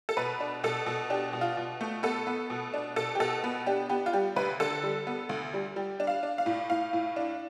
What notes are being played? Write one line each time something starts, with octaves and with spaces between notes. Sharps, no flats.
A4
B2 B4
D4
B2 A4
B2
D4 G4
B2
F4
B2
A3
B3 A4
B3
B2
D4
B2 A4
G4
B2 A4
B3
D4 G4
B3 G4
F4
G3 G4
D2 B4
D3 A4
G3
B3
D2
G3
G3 G4
D4
F5
D4
F5
A2
A2 F5
A2
D4